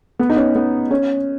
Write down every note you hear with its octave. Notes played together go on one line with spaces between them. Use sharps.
B3
D#4
C#4
B3
C#4